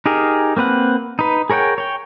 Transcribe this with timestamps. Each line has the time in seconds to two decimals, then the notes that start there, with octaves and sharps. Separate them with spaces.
0.06 D#4 G4 G#4 A#4
0.57 A#3 C4 B4 F#5
1.19 D#4 B4
1.50 G#4 A#4 C#5 F#5 G5
1.78 C#5 G5